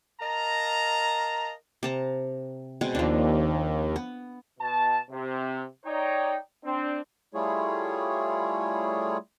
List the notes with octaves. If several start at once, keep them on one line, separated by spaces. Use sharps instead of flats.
A#4 D#5 F5 A5 A#5
C3 A5 A#5
B2 G#3 C4
D#2 F3 D4
B3
B2 A5
C3
D#4 C#5 D5 G5
C4 D4
G3 A3 E4 F4 G#4 C#5